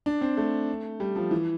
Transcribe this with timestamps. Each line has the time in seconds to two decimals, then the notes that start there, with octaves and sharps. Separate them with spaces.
0.06 D4
0.21 C4
0.37 A3
1.00 G3
1.16 F3
1.31 E3